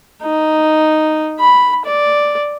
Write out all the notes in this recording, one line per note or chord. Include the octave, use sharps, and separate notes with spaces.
D#4
B5
D5